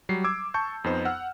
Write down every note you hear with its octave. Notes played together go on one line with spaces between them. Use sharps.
F#3 G3 C7
D6 E6 G#6
A5 C#6 G6
F2 B3 D#4 C5
F#5 E6 F6